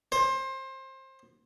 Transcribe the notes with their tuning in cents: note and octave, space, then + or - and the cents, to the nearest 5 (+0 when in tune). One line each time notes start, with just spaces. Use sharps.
C5 +25